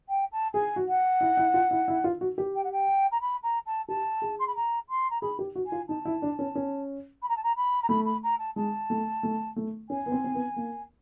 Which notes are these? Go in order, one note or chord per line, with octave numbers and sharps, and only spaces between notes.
G5
A5
G#4 G#5
F#4
F#5
E4
E4
F4
E4
E4
F4
F#4
G4
G5
F#5
G5
A#5
B5
A#5
A5
G4 A5
G#4
C6
B5
A#5
C6
A#5
G#4 B5
G4
F#4
G#5
F4
D#4 A5
E4
D4
C#4
C#4
B5
A#5
A5
A#5
B5
A#5
A3 B5
B5
A#5
A5
G#3 A5
A3
A3
A3
C#4 G#5
B3
C4
C4
B3
A#3